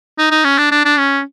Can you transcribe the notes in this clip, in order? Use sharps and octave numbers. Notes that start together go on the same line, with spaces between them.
D#4
D#4
C#4
D4
D4
D4
C#4